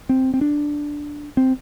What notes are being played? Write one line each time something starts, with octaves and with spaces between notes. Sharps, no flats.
C4
C4
D4
C4